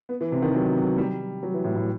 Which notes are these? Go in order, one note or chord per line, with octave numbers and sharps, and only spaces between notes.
B3
E3
C3
D#3
F#3
F#3
G3
F#3
E3
A2
A2